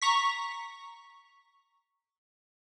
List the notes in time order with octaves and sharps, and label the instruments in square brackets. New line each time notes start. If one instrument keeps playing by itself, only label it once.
[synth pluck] A#5 C#6 B6